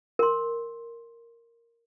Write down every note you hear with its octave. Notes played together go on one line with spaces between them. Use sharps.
A#4 C6